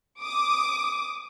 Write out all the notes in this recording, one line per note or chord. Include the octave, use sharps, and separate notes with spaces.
D6 D#6